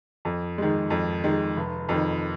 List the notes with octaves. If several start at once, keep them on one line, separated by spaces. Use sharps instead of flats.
F2
D#3 G#3
F2
D#3 G#3
F1
F2 D#3